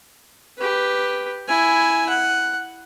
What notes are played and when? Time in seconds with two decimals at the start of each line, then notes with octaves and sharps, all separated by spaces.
0.59 G4 B4
1.48 E4 G#5
2.09 F#5